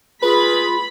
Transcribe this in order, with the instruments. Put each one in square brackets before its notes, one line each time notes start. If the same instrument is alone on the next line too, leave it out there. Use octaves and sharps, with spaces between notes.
[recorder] F4 [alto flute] G#4 [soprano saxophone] B4 [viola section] B5